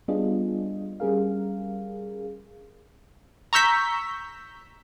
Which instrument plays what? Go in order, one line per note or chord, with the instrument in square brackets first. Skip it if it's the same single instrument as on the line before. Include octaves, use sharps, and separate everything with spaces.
[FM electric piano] G3 B3 D4 F4 G#4 D#5
G3 C#4 G#4 A#4 F5
[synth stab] A#5 C#6 E6 G6 B6